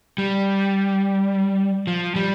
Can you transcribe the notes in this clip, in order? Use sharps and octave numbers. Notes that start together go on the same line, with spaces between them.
G3
F3
G3